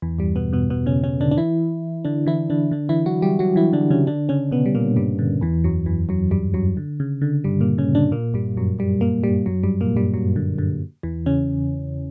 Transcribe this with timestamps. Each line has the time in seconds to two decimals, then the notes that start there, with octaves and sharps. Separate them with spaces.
0.02 E2 E3
0.19 G2 G3
0.36 B2 B3
0.53 B2 B3
0.70 B2 B3
0.86 C#3 C#4
1.04 C#3 C#4
1.21 D3 D4
1.31 D4
1.37 E3 E4
2.05 D3 D4
2.27 E3 E4
2.50 D3 D4
2.72 D3 D4
2.89 E3 E4
3.06 F#3 F#4
3.22 G3 G4
3.39 F#3 F#4
3.56 E3 E4
3.73 D3 D4
3.90 C#3 C#4
4.07 D3 D4
4.29 C#3 C#4
4.51 B2 B3
4.66 G3
4.75 A#2 A#3
4.96 G2 G3
5.19 D3
5.41 E2 E3
5.64 F#2 F#3
5.86 E2 E3
6.09 F#2 F#3
6.31 G2 G3
6.54 F#2 F#3
6.77 D3
7.00 C#3
7.22 D3
7.44 G2 G3
7.61 A#2 A#3
7.78 C#3 C#4
7.95 D3 D4
8.12 A#2 A#3
8.34 G2 G3
8.57 F#2 F#3
8.79 G2 G3
9.01 A#2 A#3
9.24 G2 G3
9.46 F#2 F#3
9.63 G2 G3
9.81 A#2 A#3
9.97 G2 G3
10.14 F#2 F#3
10.36 D3
10.58 D3
11.03 E2 E3
11.26 C#3 C#4